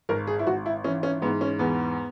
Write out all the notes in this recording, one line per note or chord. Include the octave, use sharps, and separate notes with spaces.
G#1 A#4
G#4
E4
G#1 F#4
E4
E3 C#4
C#4
G#2 B3
C#4
E2 B3